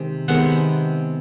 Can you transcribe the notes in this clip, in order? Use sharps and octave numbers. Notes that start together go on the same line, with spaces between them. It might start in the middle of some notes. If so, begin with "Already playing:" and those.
Already playing: C3 D#3 G#3
C3 D#3 G#3 B3 F#5